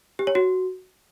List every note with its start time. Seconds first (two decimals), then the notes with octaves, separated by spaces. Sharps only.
0.19 G4
0.27 C#5
0.35 F#4